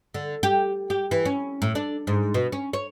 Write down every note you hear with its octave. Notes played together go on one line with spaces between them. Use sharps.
D3
G4
G4
E3
C#4
A2
D4
G#2
B2
C#4
C#5